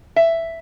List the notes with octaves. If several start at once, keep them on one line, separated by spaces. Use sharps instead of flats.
E5